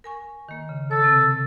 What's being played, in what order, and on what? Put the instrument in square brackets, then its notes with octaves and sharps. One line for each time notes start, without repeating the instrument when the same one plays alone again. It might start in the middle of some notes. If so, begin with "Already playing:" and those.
[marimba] A#4 G#5 C#6
D#3 A#3
C#3
[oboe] A4 [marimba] C#5
[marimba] C3 C4